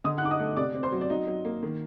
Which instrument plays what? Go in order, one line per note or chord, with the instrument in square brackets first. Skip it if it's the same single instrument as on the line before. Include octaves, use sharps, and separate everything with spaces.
[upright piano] D3 D#5 D#6
F#5 F#6
D#4 D6
D#5 D#6
A3
C3 D5 D6
C4
C5 C6
F#3
D5
F#3 D#4 D#5
F#3
A#3
D#3